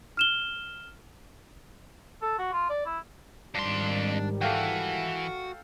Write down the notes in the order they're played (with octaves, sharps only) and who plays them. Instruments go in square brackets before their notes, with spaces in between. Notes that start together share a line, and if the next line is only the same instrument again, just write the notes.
[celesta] F6 E7 G7
[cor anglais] A4
F#4
F4
D5
E4
[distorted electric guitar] F2 C6 [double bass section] G#2 D#3 G3 [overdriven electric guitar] D4
[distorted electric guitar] E3 [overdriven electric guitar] F#4 [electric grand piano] A4 F5 G5